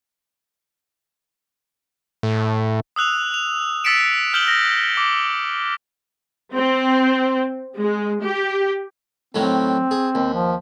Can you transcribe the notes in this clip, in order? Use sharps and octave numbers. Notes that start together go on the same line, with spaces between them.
A2
D#6 E6 F#6 F7
F7
E6 A6 B6 C#7 D7 E7
F6 G6 E7 F#7 G7
A#6
D6
C4
G#3
G4
A2 D#3 F#3 C4
G#4
D#2
F3